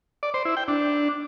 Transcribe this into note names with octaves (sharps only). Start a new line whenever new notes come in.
D5
C5
E4
G5
D4